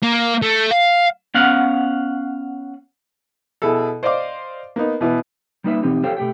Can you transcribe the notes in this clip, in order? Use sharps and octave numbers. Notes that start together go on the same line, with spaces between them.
A#3
A3
F5
B3 C#4 F5 F#5
B2 E4 G#4 A4
C5 D5 D#5 F5 D6
A#3 B3 D#4
B2 E3 B3
G3 A#3 D#4 B4 C5 E5
B2 E3 C4 D#4 G4
G4 A4 C5 C#5 F5 G5
B2 A3 G4 G5